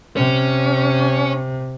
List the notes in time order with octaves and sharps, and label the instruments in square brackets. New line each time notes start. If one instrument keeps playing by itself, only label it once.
[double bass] C3 [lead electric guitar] C#4